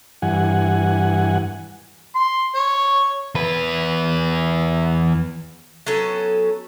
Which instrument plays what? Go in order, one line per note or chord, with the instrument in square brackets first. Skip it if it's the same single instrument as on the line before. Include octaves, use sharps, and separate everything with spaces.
[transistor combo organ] G2 E3 F#5 G#5
[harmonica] C6
C#5
[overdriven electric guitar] E2 B4
[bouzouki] F#3 B3 C#4 A4